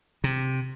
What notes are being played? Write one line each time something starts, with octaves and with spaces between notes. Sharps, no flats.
C3